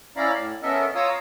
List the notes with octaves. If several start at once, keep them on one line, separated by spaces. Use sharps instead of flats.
C#4 E4 D5 F5 A#5 B5
A2
B3 C#4 A4 A#4 D#5 E5
F4 C#5 F5 A#5 D#6 E6